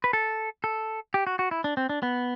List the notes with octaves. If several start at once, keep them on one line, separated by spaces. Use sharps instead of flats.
B4
A4
A4
G4
F#4
F#4
E4
D4
C4
D4
B3